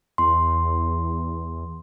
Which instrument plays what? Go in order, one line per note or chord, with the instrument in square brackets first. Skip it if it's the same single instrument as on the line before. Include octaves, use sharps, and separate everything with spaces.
[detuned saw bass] E2 [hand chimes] C6